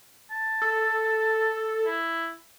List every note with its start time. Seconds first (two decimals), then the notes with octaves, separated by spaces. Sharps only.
0.31 A5
0.62 A4
1.86 E4